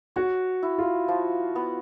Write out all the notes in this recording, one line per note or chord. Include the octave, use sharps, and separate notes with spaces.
F#4 C#5
E4
F4
F3
B3